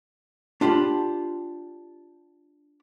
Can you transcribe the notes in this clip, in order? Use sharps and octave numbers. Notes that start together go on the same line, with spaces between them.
D4 F4 G4 B5